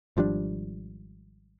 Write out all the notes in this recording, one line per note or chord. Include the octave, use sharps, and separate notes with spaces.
G#1 F3 G3 D4